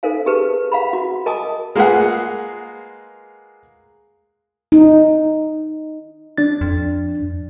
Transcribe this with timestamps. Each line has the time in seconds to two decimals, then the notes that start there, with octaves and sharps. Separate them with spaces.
0.03 D#4 A4 A#4 C5 F5 G#5
0.26 G4 G#4 A#4 B4 A5
0.72 F5 F#5 A#5 B5
0.93 F#4
1.26 A#4 D#5 G#5 A5 D6 D#6
1.75 G#3 A#3 F4 G#4 B4 F#5
4.72 D#4
6.38 D4 A6
6.61 F2